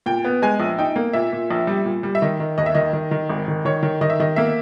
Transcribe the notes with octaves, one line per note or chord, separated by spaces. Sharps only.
A#2 G5
B3
G#3 G#5
A#1
D#4 G5
A#3
A#2 E5
A#2
A#1
G3
A#2
G3
E5
D#3 D#5
D#3
D#2 D#5
E5
D#3 D#5
D#3
D#3
G#1
D#3
D#3 C#5
D#3
D#3 D#5
E5
D#3 D#5
A#3 E5